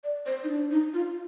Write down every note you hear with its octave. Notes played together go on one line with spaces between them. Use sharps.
D5
C5
D#4
D4
D#4
F4